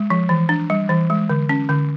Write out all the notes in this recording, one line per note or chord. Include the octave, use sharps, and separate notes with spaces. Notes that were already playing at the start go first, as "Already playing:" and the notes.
Already playing: G#3
F3
E3
D4
G3
E3
G#3
D3
C#4
D3